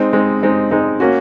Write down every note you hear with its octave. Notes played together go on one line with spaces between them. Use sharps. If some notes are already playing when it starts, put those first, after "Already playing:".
Already playing: G#3 C4 D#4
G#3 C4 D#4
G#3 C4 D#4
G#3 C4 D#4
A#3 C#4 F#4